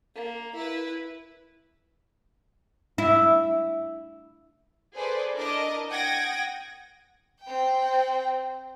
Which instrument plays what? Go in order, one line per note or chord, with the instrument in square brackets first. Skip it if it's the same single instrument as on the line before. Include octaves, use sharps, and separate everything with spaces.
[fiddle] A#3
E4 B4
[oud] E4
[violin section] G#4 A4 B4 C5 D5
D4 E4 A#4 D#5 A5 D6
F#5 G5 D#6 G#6 A#6 D7
[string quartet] C4 G5